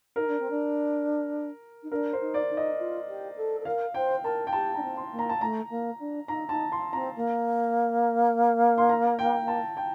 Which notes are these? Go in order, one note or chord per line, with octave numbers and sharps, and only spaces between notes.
D#4 A#4
D4
C4
D4
D#4
D4 A#4
C5
D#4
D5
D#4
D#5
F4
G4
A4
A4
A#4 F5
C5 G5
A#4 A5
G5
G4 A5
D4 A#5
C4
C6
A#3
A#5
A5
A3 A#5
A#3
D4
D#4 A#5
D#4 A5
C6
C4 A#5
A#3
C6
A#5
G5
A5
G5